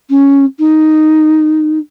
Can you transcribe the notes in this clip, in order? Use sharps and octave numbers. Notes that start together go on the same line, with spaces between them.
C#4
D#4